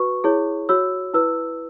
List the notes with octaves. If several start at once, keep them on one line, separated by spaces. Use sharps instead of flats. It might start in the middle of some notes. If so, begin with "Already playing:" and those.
Already playing: F#4 B4 C#6
E4 G#4 C#5
F#4 C#5 E6
E4 B4 E6